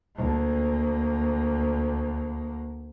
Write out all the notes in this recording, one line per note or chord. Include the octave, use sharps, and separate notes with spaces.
D2 A#3